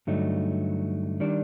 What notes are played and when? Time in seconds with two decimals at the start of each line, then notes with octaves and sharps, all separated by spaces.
0.07 G2 D3 F#3 A3 D#4
1.20 D#3 G3 D4